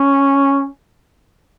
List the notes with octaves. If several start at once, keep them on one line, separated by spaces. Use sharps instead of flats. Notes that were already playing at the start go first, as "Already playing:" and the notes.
Already playing: C#4